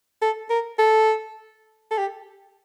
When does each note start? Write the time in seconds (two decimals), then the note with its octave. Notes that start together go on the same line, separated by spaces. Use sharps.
0.22 A4
0.50 A#4
0.79 A4
1.91 A4
1.98 G4